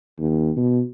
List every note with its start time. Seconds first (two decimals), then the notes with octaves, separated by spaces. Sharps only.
0.19 D#2
0.57 B2